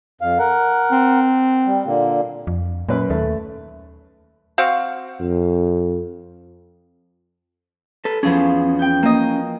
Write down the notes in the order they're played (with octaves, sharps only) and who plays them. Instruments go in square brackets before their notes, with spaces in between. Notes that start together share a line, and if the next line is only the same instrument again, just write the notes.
[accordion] F2 F5
A#4 F#5
[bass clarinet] C4
[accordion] G3
A#2 D3 A#3
[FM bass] F2
[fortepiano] F#2 B4 B5 [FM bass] A#2
[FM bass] D#2 [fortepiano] A3
[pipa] C4 F#4 F5
[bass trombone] F2
[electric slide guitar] A4 B4
[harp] E2 F3 G#4 [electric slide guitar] C#4
[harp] G5 G6
A#3 D#5